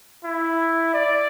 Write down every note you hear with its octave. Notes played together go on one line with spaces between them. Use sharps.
E4
D5